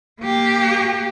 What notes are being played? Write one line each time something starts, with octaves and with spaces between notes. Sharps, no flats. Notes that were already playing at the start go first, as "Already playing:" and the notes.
A#3 G4